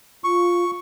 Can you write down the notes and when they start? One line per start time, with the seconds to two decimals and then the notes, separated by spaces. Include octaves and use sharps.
0.24 F4 C#6